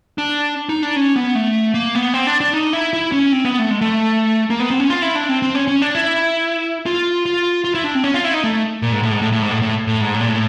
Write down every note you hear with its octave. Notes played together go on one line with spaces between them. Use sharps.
D4
D#4
D4
C#4
B3
A3
A#3
B3
C4
D4
D4
D#4
E4
E4
C#4
C4
B3
A3
G#3
A3
A#3
B3
C4
C#4
F4
E4
D4
C4
C4
C#4
C#4
D4
E4
F4
F4
F4
E4
D4
C4
C#4
F4
E4
D#4
A3
A#2
G#2
A2
G#2
A2
A2
G#2
A2
A2
A2
G#2
A2
A#2
A2